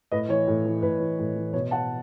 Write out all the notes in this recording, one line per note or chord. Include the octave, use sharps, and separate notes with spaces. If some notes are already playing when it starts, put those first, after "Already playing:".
A2 B4 D#5
E3 C#5
A2
E3
A2 B4
E3
A2
E3
B2 C#5
F#5 A5